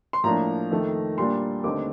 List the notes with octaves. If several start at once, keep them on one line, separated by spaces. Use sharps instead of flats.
C6
A2 F3 A#3 D4 A#5
F2 D#3 A3
A#2 G3 A#3 D4 C6
D#2 D3 A3 C4 D#4 D6